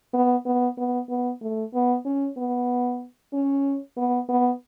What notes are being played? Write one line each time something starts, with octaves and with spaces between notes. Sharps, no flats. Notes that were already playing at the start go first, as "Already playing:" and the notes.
B3
B3
B3
B3
A3
B3
C#4
B3
C#4
B3
B3